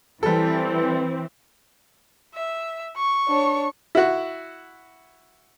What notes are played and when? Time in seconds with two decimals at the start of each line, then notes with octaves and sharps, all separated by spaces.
0.23 E3 G3 C4 A4
2.34 E5
2.96 C#6
3.28 D4 C#5
3.95 E4 F#4